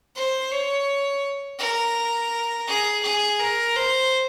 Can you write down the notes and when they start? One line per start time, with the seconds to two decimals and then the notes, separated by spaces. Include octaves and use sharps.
0.16 C5
0.52 C#5
1.59 A#4
2.68 G#4
3.03 G#4
3.39 A#4
3.76 C5